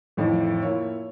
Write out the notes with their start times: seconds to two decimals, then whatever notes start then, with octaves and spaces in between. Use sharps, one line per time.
0.17 F2 A2 D#3 E3
0.62 A#3 E4 F4 C#5